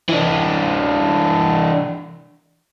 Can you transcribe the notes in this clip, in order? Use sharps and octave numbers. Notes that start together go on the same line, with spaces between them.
E3 D4